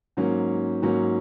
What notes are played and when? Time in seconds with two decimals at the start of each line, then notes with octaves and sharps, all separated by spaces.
0.17 G#2 F#3 A#3 C#4
0.82 G#2 F#3 A#3 C#4